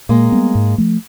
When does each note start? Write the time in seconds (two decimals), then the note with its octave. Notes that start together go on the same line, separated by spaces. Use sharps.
0.09 A#2 G#3 A#3
0.32 G3 B3
0.55 G#2
0.78 F3 A3